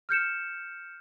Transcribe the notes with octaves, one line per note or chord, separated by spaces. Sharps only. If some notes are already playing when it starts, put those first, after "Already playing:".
F6 G6 C#7 E7